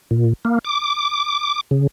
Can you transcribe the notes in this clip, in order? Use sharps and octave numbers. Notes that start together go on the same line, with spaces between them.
A#2
A#3
D6
C#3